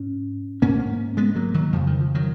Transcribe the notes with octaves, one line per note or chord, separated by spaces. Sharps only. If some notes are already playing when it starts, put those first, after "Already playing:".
Already playing: G#2 C#4
G#2 A#3 C#4
G#3 B3
F#3 A#3
D#3 F#3
F2 C#3 F3
D#3
F3
D#3 F#3